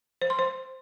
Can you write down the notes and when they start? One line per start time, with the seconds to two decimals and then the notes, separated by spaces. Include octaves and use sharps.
0.22 C5
0.30 C6
0.39 C5